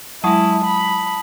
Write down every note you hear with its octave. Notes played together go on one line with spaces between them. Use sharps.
F#3 G#3 E4 A5 D#6
B5